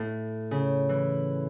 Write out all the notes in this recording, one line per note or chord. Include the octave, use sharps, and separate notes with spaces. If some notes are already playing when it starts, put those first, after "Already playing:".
Already playing: A2
C#3
E3